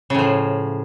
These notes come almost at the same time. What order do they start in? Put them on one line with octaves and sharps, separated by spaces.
C#3 A2 F3